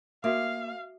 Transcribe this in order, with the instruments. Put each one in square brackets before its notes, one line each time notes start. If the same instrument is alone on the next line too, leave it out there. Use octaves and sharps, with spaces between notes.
[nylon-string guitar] A#3 [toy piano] F#4 E5 D#6 [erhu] F5